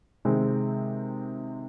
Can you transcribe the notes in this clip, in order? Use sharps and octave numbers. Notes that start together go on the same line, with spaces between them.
C3 D#3 G#3 C4